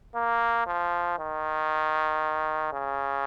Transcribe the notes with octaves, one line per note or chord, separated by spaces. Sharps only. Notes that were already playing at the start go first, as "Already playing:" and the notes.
A#3
F3
D#3
C#3